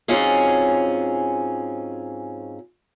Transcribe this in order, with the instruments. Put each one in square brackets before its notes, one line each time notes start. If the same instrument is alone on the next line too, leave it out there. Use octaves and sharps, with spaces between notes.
[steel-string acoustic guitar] G#2 F#3 C4 C#4 F4 G#4